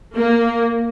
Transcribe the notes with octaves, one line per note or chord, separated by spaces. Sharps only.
A#3